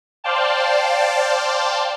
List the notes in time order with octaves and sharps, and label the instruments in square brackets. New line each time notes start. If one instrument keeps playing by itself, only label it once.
[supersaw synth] C5 D5 F5 G5 A5